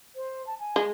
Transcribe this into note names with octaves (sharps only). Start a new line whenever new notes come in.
C5
A5
G#5
G#3